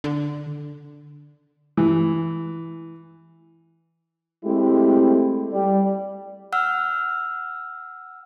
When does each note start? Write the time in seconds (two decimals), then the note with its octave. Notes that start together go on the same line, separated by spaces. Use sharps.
0.04 D3
1.77 E3
4.45 G#3 A3 C4 E4 G4 A4
5.53 G3
6.53 F#5 E6 F6